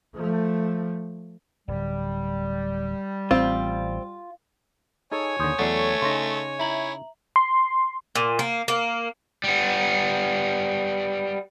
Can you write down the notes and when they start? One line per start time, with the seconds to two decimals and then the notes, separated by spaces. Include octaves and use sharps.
0.14 F3 A3
1.68 D1 G3
3.31 A1 C4 F4
5.12 D#4 G#4 A4 C#5 G#5
5.39 D#2 D3 C6 D#6 G6
5.59 E2 F#3 A3 F#4 A4 D5 C7
6.02 C#3 C#4 D#4 C6 A#6
6.59 E4 E5 A#5 F#7
7.36 C6
8.15 A#2
8.39 A#3
8.68 A#3
9.44 G3 B3